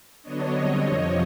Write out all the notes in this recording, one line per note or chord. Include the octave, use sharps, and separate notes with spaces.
D3 F#3 B3 D4 C#5 D#5
D3 G3 C4
F2 C3 F3 C#5 D#5